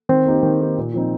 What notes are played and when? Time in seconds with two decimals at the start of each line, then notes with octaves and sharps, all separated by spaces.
0.09 D#3 C4
0.26 A#3 D#4 G4
0.43 D#3
0.60 A#3 D#4 G4
0.78 A#2
0.94 F3 C4 D#4